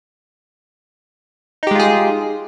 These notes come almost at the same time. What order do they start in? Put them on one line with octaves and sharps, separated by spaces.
D#4 G4 G#3 F4 G#4